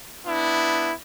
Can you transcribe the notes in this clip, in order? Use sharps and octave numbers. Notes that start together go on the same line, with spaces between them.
B3 D4 E4